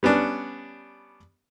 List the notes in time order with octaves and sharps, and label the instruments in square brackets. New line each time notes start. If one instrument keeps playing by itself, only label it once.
[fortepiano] G3 B3 C#4 D4